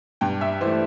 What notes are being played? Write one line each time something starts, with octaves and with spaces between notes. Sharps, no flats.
G2 G5
E5
E3 A3 C5